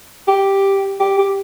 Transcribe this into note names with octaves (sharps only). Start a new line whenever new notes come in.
G4
G4
G4